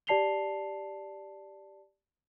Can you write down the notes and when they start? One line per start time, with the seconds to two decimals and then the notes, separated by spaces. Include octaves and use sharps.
0.07 G4 D5 A5 C7 F7 G7